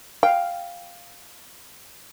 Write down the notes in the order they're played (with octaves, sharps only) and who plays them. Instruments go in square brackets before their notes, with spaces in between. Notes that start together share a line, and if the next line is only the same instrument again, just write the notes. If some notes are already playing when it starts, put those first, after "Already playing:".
[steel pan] F5 [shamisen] G5